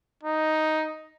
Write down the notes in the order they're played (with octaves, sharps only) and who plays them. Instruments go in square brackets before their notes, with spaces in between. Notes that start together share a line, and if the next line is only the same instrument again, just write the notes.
[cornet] D#4